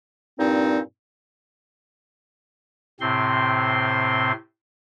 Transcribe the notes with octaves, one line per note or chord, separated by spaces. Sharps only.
G2 A#2 C4 D#4
A2 C3 C4 C6